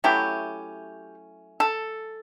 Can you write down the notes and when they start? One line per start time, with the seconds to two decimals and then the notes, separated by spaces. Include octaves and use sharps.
0.04 F#3 A3 C#4 E4 G4
1.60 A4